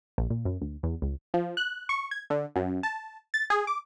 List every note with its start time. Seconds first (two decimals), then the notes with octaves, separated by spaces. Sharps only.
0.18 A#1
0.30 A#2
0.45 F#2
0.62 D2
0.83 E2
1.02 C#2
1.34 F3
1.57 F#6
1.89 C#6
2.11 G#6
2.30 D3
2.56 F#2
2.83 A5
3.34 A6
3.50 G#4
3.67 D6